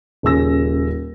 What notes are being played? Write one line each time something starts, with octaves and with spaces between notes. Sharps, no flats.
D#1 C#3 C#4 E6 A#6